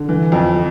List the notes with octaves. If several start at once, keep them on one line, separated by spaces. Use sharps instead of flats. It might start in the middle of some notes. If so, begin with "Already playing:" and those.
Already playing: D3
E3
F2